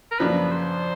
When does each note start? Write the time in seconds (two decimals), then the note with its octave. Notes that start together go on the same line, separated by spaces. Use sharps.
0.11 A#4
0.19 F#2 C#3 F3 A#3 D4 B4
0.52 C5